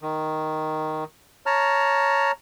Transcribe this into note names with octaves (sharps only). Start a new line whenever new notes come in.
D#3
C#5 A5 A#5 F6